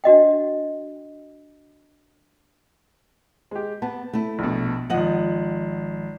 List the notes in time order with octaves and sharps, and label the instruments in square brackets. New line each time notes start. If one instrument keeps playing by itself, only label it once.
[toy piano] D4 F#4 D#5 G5
[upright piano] G#3 G4
[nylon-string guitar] B3 [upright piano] A5
[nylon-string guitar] A3 E4
[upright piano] A#1 B2
[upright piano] G#1 F#7 [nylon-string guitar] F3 D#5 F#5